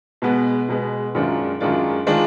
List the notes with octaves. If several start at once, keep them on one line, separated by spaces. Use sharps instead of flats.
B2 G#3 B3
B2 G#3 B3
F#2 D#3 G#3 D4 F4
F#2 D#3 G#3 D4 F4
D#3 G#3 D4 F4